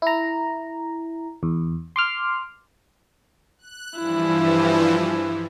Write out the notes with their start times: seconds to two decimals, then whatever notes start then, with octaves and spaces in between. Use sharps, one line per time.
0.02 E4 A#5
1.43 E2
1.96 C6 D6 F6
3.59 F#6
3.98 G2 E3 F3 E4